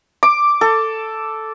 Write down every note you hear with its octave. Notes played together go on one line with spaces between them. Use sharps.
D6
A4